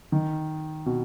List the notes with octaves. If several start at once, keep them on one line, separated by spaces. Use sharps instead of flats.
D#3
B2